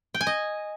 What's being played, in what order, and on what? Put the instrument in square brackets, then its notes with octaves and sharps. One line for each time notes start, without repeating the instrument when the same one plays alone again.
[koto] G5
G#5
D#5